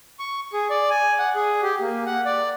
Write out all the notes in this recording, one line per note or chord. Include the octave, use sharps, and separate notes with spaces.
C#6
G#4
D5
G#5
F#5
G#4
G4
A#3
F#5
D5